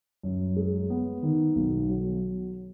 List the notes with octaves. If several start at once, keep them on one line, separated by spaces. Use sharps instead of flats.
F#2
G#3
B3
D#3
B1
F#3